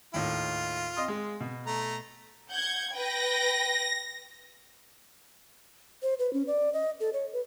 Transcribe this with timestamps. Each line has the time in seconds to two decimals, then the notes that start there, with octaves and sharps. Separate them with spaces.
0.14 D#2 A2 F4
0.97 D#5 C6 D#6
1.08 G#3
1.40 B2
1.66 A3 A#5
2.50 F#5 G6 G#6
2.93 B4 G5 A#6
6.03 C5
6.19 B4
6.33 C#4
6.47 D5
6.73 D#5
7.00 A4
7.13 C#5
7.33 B4